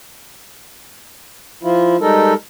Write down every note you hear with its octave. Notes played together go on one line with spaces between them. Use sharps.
F3 E4 F4
G3 G#3 D#4 A4 A#4